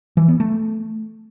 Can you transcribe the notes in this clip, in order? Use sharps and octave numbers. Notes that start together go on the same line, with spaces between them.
E3
B3
A3